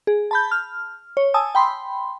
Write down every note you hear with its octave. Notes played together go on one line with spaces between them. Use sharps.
G#4
A5 B5 G6
F6
C#5
G#5 A5 D#6 E6
G5 B5 C6